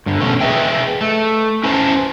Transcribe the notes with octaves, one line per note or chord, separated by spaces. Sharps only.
G2 D3
B2 A3 C#4
G#4 B4 D#5 E5 G5
A3
C#4 E4 B4 C5 F5 A5